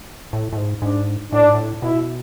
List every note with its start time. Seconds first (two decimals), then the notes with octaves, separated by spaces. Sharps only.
0.33 A2
0.53 A2
0.57 G#2
0.82 G#2 D4
1.32 A2 D4
1.44 G#2
1.54 A2
1.82 B2 E4